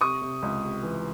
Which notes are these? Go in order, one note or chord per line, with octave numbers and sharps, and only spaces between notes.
C3 C#6 D#6
C3
C#2
C3
E3